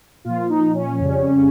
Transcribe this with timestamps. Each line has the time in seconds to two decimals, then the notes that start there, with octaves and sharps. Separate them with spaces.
0.25 A#2 F3 F4
0.49 D#4
0.74 C#4
0.99 F2 C#3 G3